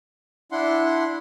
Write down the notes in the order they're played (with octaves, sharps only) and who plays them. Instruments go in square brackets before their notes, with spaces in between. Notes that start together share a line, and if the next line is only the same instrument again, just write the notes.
[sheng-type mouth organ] D4 E4 F#5 C6